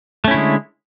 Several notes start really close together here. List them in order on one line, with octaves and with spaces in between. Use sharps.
A3 C#4 E4 D3 G#3